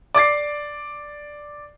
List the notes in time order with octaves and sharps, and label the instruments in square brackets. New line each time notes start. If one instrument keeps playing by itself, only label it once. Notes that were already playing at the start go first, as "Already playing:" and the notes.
[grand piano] D5 D6 A6 C7